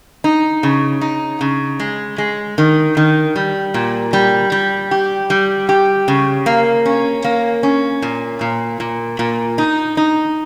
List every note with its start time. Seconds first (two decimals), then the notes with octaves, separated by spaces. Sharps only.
0.24 D#4
0.63 C#3
1.01 D#4
1.41 C#3
1.80 G#3
2.18 G#3
2.58 D#3
2.97 D#3
3.36 G3
3.74 A#2
4.13 G3
4.52 G3
4.91 G4
5.30 G3
5.69 G4
6.08 C#3
6.46 A#3
6.85 C#4
7.24 A#3
7.63 C#4
8.02 A#2
8.41 A#2
8.80 A#2
9.19 A#2
9.58 D#4
9.97 D#4